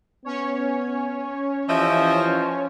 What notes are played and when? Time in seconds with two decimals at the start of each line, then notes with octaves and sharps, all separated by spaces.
0.25 B3 C#4 C#5
1.69 E3 F3 G4 D#5 E5